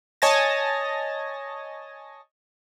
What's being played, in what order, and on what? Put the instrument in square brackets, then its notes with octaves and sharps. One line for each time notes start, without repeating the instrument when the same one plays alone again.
[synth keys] C#5 D#5 G#5 A5 A6 A#6